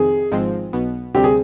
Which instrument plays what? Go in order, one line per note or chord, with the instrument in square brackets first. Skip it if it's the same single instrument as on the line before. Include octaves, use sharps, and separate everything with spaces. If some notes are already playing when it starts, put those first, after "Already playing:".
Already playing: [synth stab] F2 C3 D#3 [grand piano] G#4
[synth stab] G#1 G#2 F3 G#3 C4
B1 B2 B3
[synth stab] D2 C3 G3 C4 [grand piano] G4
[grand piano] G#4